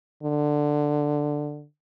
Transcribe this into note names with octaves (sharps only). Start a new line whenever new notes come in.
D3